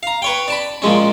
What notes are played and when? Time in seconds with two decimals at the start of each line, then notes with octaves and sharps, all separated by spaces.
0.03 F5 A#5
0.22 B4 C#5 G5
0.48 D5 A5 B5
0.82 A#2 F3 G#3 C#4